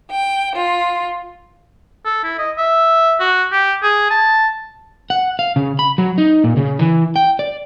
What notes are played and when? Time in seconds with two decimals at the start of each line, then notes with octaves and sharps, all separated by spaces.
0.11 G5
0.56 F4
2.05 A4
2.24 E4
2.38 D#5
2.58 E5
3.20 F#4
3.52 G4
3.83 G#4
4.11 A5
5.10 F#5
5.39 F5
5.56 C#3
5.79 B5
5.98 F#3
6.18 D#4
6.44 A#2
6.57 C#3
6.79 E3
7.16 G5
7.39 D5